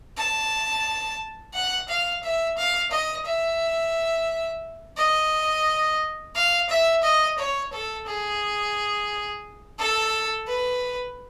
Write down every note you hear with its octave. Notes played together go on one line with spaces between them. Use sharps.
A5
F#5
F5
E5
F5
D#5
E5
D#5
F5
E5
D#5
C#5
A4
G#4
A4
B4